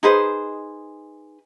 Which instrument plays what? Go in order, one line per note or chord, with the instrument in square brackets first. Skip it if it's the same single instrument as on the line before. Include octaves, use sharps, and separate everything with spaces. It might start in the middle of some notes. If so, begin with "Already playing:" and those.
[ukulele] D#4 G#4 B4 C5